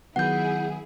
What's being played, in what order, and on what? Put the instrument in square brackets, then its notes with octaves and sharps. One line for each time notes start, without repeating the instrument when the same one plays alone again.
[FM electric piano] D#3 F#3 B3 [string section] E4 G#4 [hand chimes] F#5 G6